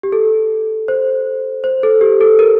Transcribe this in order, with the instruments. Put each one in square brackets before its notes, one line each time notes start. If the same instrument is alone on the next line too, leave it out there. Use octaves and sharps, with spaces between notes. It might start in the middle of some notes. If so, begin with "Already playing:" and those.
[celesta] G4
A4
C5
C5
A4
G4
A4
A#4